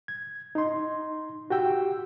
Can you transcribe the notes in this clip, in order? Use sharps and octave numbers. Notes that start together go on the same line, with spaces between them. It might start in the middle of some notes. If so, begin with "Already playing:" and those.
G#6
D#4 C6
F#4 G4 G5 E6